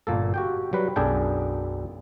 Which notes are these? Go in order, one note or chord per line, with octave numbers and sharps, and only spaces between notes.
G1 A#2 A#3 A4
F#4 G4 G5
F#3 G3 B4
B1 F#2 D4 G#4 A4 G5